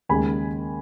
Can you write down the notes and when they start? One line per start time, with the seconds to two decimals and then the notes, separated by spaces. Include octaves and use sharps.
0.09 D#2 C#3 G#3 G#5 B5